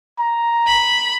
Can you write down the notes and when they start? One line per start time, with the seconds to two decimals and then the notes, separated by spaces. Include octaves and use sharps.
0.19 A#5
0.67 B5